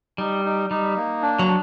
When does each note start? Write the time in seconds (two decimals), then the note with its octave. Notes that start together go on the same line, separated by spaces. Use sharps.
0.18 G3 D#4
0.45 D#4
0.70 G3 D#4
0.97 A#3
1.22 D4
1.39 F#3
1.47 D4